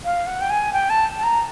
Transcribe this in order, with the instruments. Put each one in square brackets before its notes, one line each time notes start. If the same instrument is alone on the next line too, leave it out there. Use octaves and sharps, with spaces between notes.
[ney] F5
F#5
G5
G#5
G5
A5
A5
A#5